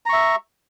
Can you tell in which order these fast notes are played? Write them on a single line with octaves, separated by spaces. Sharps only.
A#5 C#6 E5